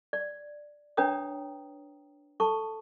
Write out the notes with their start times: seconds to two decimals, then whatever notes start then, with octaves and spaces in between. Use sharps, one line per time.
0.13 D5
0.97 D4 B4 C#5 G5 A#5 D#6
2.40 A4 A5 C#6